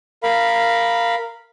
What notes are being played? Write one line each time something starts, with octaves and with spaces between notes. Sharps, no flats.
A#4 F5 B5